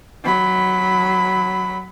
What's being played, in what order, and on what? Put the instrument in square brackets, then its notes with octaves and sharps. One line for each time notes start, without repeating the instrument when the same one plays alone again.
[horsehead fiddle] F#3 B5